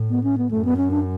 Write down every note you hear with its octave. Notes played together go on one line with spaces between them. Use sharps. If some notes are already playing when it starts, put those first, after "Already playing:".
Already playing: A2
B3
C#4
B3
F#2 A3
B3
C#4
D4